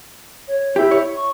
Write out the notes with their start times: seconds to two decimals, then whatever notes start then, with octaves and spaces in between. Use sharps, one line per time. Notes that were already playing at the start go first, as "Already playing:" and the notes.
0.48 C#5
0.76 E4 G4
0.91 C#5
1.16 C#6